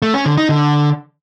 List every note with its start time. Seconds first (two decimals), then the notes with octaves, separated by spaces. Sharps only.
0.02 A3
0.14 C#4
0.26 D3
0.37 D#4
0.49 D3